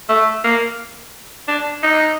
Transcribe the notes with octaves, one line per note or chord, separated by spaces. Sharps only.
A3
A#3
D4
D#4